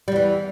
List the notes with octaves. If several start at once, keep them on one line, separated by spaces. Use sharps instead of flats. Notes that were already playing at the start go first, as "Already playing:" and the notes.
E2 E3 G3